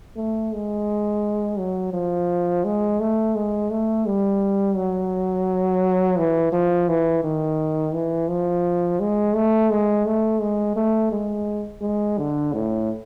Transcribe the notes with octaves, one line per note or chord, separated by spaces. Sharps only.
A3
G#3
F#3
F3
G#3
A3
G#3
A3
G3
F#3
E3
F3
E3
D#3
E3
F3
G#3
A3
G#3
A3
G#3
A3
G#3
G#3
D3
A2